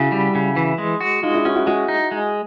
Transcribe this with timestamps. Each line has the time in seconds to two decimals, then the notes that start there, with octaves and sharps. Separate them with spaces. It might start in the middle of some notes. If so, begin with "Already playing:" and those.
Already playing: C#3 E4 F#4
0.12 G3
0.35 C#3
0.56 E3
0.78 G#3
1.01 F#4
1.23 G#3 D#4 F4
1.34 D4 E4
1.45 C#4 E4 F#4
1.55 E4 F#4
1.66 G#3 E4 F#4
1.88 D#4
2.11 G#3